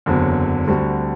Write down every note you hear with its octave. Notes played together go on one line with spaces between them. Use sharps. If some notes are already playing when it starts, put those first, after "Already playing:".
F#1 E2 D3 F#3 C4
D2 D3 G3 C4 F#4